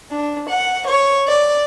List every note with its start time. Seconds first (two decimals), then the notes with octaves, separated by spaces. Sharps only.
0.12 D4
0.48 F#5
0.86 C#5
1.27 D5